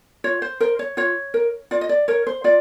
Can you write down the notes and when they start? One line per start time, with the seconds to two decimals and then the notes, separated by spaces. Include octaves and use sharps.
0.24 F4 C#5
0.42 C5
0.60 A#4 C5
0.79 C#5
0.97 F4 C#5
1.34 A#4
1.71 F4 D5
1.81 D#5
1.89 D5
2.08 A#4 C#5
2.27 C5
2.44 F4 D5